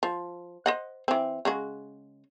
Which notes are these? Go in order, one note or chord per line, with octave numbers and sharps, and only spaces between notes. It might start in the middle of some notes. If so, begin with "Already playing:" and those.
F3
C5 D#5 F#5
E3 C4
C#3 G#3 F#4